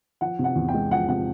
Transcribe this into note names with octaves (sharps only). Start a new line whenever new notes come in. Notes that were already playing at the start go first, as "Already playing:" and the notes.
F3 F#5
C3
F#5
E2
G5
G#3
F3 F#5
C3 F#5